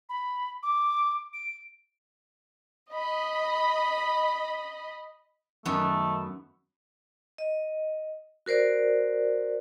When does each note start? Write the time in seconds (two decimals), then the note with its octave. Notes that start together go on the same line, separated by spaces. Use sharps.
0.09 B5
0.63 D6
1.33 D7
2.91 D#5 B5
5.65 F#2 D#3 A3 B3
7.38 D#5
8.46 F#4 A#4 C5 D5